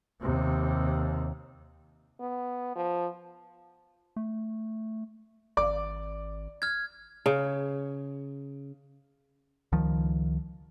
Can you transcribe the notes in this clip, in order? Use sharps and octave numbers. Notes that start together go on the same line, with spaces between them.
D#2 C3
B3
F3
A3
G#1 D5 D6
F6 G#6
C#3
C#2 D#3 F3